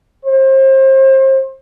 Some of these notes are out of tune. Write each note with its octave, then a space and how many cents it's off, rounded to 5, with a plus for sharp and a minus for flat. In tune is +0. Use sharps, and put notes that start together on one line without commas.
C5 +35